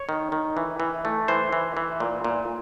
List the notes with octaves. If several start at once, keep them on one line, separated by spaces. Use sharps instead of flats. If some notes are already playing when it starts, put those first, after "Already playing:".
Already playing: C#5
D#3
D#3
E3
E3
A3
E3 C5
E3
E3
A#2
A#2